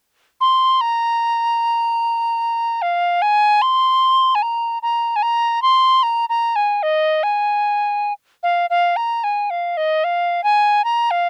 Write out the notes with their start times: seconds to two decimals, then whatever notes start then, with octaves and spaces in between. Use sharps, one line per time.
0.41 C6
0.81 A#5
2.82 F5
3.22 G#5
3.62 C6
4.35 G#5
4.42 A#5
4.82 A#5
5.16 G#5
5.22 A#5
5.62 C6
6.03 A#5
6.29 A#5
6.56 G#5
6.83 D#5
7.23 G#5
8.43 F5
8.70 F5
8.96 A#5
9.24 G#5
9.50 F5
9.77 D#5
10.04 F5
10.44 G#5
10.84 A#5
11.11 F5